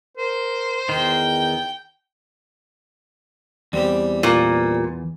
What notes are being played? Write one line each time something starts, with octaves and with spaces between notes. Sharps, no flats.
A#4 C5
E2 D#3 G5
E2 G3 C4 G4
A#2